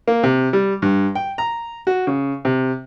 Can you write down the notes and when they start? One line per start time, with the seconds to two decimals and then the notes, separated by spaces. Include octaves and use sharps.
0.08 A#3
0.23 C3
0.53 G3
0.82 G2
1.15 G5
1.38 A#5
1.87 F#4
2.07 C#3
2.45 C3